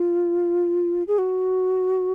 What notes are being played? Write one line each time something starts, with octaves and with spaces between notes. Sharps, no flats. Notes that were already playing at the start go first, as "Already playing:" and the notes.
Already playing: F4
G#4
F#4